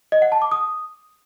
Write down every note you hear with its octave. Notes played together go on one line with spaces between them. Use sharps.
D#5
F#5
A5
D6
D#6